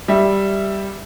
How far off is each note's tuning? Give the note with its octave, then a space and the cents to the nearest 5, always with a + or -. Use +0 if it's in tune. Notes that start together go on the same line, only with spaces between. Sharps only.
G3 +0 E5 +0